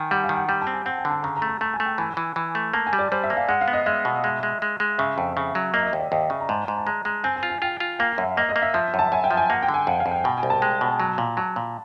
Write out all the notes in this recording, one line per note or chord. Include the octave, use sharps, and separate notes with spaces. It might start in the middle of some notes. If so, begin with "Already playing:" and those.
Already playing: D#3 G#5
G3 F#5
F5
D#3
F#5
G3 G5
A5
C4
G#5
C4 F#5
G5
D3
A5
C#3 A#5
A#5
A3
A#5
A3 A5
G#5
A3
G5
E3 G#5
E3
E3
A3
A#3 A5
G#5
G3
D5
G3 C5
E5
A#3
F5
G#3 F#5
F5
B3
D#5
G#3 E5
B2
G#3
G#3
G#3
G#3
C#3 E5
F2
C#3
F#3
A#3 D#5
E5
D#5
D#2
D5
D#2 D#5
C#3 E5
A#5
G#2 A5
G#2
A5
G#3 A#5
G#3 A#5
C4 G#5
G#5
F4
G#5
F4 G5
F4
A#3 F5
F#2 E5
A#3 D#5
D#5
A#3
E5
F3 E5
F#2
A5
F#2 G#5
G5
F3
G#5
A#3 F#5
G5
D3
G#5
F2 F#5
F5
F2
G5
B2 G5
G#5
C2
A5
G#3
B2
F#3
A#2
F#3 A5
A#2 B5